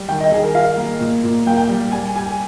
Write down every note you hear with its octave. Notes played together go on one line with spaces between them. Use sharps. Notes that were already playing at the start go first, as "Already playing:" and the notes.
Already playing: G3
D#3 G5
D#5
D#3 G#4
A#4
F4 F5
A#3
A#2
A#2
A#3 G5
G5
G3
G3 G#5
G4 G#5